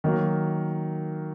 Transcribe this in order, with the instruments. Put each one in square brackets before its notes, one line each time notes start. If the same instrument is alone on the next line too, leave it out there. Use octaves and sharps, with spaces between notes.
[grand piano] D#3 F#3 A#3